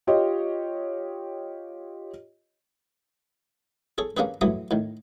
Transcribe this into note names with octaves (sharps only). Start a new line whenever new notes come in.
F4 G4 C#5 D#5
G#4 A4 C#5
A#3 C#4 D4 G4 G#4 B4
F#2 E3 F#3 A3 G4 D#6
A2 D#3